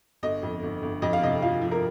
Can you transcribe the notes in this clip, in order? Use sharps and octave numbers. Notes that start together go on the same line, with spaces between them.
G1 D#5
F2
G1
G1
F2 D#5
F5
C3 D#5
F3 F5
F3
A#4